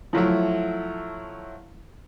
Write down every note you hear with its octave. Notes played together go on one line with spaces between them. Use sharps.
F3 F#3 A3 E4